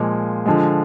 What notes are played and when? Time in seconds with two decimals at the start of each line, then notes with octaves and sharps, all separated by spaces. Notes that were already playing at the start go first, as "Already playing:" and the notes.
Already playing: A#2 F3 G#3 D6
0.46 D3 F3 G#3